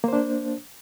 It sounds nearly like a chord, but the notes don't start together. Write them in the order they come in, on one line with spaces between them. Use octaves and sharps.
A#3 C5 D4